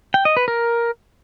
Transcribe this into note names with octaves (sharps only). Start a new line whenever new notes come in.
G5
D#5
B4
A#4